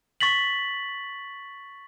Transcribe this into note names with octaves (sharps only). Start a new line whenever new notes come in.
C#6 A6 B6 F#7